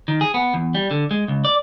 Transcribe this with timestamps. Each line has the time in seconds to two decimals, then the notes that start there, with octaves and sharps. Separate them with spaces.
0.08 D#3
0.21 G#4
0.34 B3
0.54 E2
0.75 G3
0.91 D3
1.11 G#3
1.28 C#2
1.45 D5